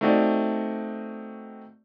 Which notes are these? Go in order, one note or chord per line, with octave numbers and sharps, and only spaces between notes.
A3 C4 D#4 F#4 D5